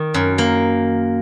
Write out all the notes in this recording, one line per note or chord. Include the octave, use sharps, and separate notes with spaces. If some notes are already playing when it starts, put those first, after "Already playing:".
Already playing: D#3
F#2
A#3